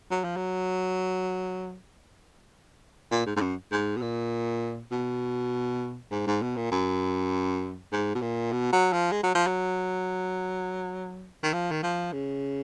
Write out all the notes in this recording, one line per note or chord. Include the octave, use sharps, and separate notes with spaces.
F#3
F3
F#3
A#2
G#2
G#2
F#2
G#2
B2
A#2
B2
G#2
G#2
B2
A#2
F#2
G#2
B2
A#2
B2
F#3
F3
G#3
F#3
F3
F#3
D#3
F3
D#3
F3
C#3